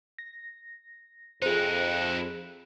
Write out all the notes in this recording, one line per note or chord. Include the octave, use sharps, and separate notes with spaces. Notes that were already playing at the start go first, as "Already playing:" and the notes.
A#6
F2 D#4 E4 G#4 C5 F#6